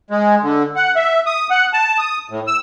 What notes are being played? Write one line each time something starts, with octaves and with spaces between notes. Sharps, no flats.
G#3
D3
F#5
E5
D#6
F#5
A5
D#6
A2
E6